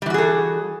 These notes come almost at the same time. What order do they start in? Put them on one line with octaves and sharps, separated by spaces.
G3 E3 F#4 G#4 A4